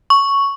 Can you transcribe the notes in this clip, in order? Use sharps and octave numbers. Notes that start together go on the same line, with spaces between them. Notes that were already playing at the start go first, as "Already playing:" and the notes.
C#6